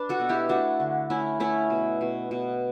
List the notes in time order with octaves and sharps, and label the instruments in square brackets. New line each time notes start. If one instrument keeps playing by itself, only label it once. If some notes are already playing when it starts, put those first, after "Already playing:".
Already playing: [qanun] D4 B4
F#4 A4
B2
E4 G4
A3 D4 F#4
D3
A3 C#4 E4
A3 C#4 E4
B2
B2
B2